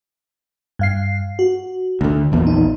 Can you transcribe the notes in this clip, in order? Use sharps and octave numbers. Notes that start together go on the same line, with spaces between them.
G2 F5 C7
F#4
D2 D3
A#1 E2 A#2
D#4